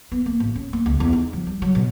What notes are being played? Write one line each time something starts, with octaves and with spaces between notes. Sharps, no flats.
B3
A#3
A1
C#4
A#3
C#2
E2
D#4
F3
G3
F#3
B2